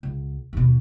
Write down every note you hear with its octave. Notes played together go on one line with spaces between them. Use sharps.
C#2
D#2 B2